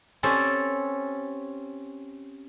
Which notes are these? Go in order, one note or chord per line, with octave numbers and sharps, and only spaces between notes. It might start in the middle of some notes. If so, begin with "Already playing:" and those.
C4 C#4 G4 A4